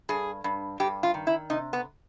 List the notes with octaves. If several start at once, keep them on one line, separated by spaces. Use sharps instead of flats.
G2 G#4
G2
G2 G4
F4
D#3
E4
C3 D#4
B3